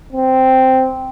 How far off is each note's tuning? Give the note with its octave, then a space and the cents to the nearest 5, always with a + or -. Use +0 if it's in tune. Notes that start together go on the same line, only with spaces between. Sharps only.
C4 -5